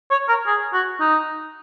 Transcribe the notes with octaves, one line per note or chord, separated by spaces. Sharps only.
C#5
A#4
G#4
F#4
D#4